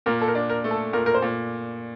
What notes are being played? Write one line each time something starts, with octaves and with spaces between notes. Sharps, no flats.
A#2 A#4
A4
A#4
D4
A#4
A3
A4
A#2 A#4
A#4
C5
A#2